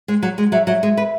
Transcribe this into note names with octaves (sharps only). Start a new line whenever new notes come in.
G#3
F#3
G#3
F#3 E5
F#3 E5
G#3
B4